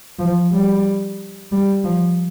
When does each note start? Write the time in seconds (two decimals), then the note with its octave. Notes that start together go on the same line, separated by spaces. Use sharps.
0.19 F3
0.53 G3
1.52 G3
1.84 F3